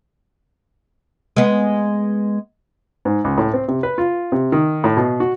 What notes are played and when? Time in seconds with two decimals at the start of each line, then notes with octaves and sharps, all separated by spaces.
1.37 G#3 B3
3.05 G#2
3.24 C#2
3.38 A2
3.54 C4
3.68 C3
3.83 B4
3.98 F4
4.32 C3
4.52 D#3
4.84 A2
4.97 B2
5.20 F#4